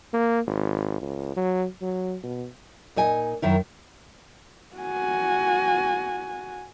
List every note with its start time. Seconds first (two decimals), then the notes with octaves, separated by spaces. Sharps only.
0.13 A#3
0.47 G#1
1.02 C#2
1.36 F#3
1.81 F#3
2.23 B2
2.96 A#2 D#4 D#5 G#5
3.42 F#2 D#3 E4
4.77 F#4 G#5